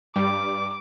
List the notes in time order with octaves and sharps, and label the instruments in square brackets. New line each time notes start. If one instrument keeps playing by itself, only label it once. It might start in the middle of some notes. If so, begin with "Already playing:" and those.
[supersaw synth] G2 G3 [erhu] D6